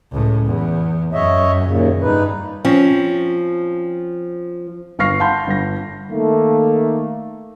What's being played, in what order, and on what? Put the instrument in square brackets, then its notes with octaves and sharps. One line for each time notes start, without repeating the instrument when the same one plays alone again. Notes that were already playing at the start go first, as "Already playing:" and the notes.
[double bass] C#2 A2
E2
[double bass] F#2 [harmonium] C#5 D#5 E5
[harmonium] D#2 A#2 C#3
[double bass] G2 [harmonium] D#4 B4
[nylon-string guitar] F3 C4 C#4
[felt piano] G1 F5 C#6 F6 A#6 C7
F5 F#5 A5 B5 C6 G6
G1 A#6
[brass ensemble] D#3 A3 A#3